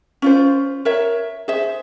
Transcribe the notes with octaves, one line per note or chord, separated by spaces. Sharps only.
C#4 F4 C5
A#4 C#5 E5
G#4 C5 E5